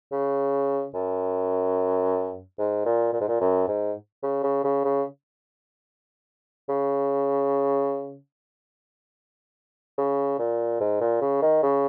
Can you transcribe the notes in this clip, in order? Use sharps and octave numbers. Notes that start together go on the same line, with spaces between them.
C#3
F#2
G#2
A#2
A#2
G#2
A#2
F#2
G#2
C#3
C#3
C#3
C#3
C#3
C#3
A#2
G#2
A#2
C#3
D#3
C#3